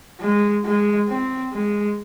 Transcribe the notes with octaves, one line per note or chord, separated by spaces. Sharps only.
G#3
G#3
C4
G#3